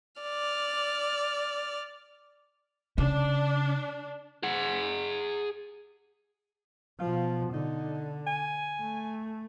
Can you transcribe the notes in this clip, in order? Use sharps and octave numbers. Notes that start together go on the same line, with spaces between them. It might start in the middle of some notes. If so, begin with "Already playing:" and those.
D5 F6
C#3 D4
G#4 F#5
B2 F3 F4
D3 D#4
G#5
A3